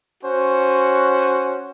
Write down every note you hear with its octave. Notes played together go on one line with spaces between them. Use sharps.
C#4 F#4 C5